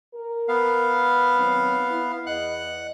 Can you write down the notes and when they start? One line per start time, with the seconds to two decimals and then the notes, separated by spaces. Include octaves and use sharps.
0.15 A#4
0.48 B3 F5
1.37 D#3 F#3 C4
1.90 E4 B4
2.27 E2 D#5 F#5 F#6